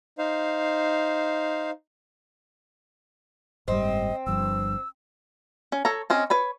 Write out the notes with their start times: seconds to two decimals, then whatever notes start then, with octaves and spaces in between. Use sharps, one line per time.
0.18 D#4 C5 F5
3.68 F#1 G#2 G3 C4 D#5
4.26 G1 G2 F3 E6
5.72 C#4
5.85 A4 C#5 A#5
6.10 C4 C#4 D#5
6.30 B4 C#5 B5